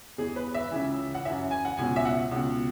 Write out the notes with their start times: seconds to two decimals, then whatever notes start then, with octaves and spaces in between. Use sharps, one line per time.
0.18 E2 E3 G#4
0.36 B4
0.54 E5
0.71 C#2 C#3 E3
1.15 F#5
1.25 F#2 E3 E5
1.51 G#5
1.65 F#5
1.77 C#2 B2 G#5
1.96 E5
2.05 F#5
2.31 C#2 B2